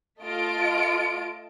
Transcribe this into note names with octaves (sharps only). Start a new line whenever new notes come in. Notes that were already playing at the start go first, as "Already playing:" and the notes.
A3 F4 D#5 A5 D7